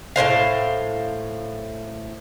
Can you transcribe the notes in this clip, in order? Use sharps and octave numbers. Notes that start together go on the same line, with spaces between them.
A2 C#3 C5 F5